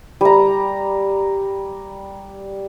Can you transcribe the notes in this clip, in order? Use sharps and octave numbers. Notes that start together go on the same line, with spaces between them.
G3 A#5